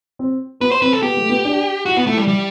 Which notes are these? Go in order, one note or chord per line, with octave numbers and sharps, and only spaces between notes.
C4
B3 B4
C5
C4 B4
A4
B3 G4
A3
B3
D4
E4 F#4
B3
A3 E4
G3
G3